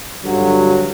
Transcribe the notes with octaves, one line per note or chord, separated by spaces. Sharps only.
G2 D3 F#3